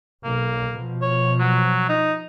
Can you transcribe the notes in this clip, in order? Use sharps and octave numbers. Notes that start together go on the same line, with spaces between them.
B1 A#3
B2 F3
C#5
F#3
D#4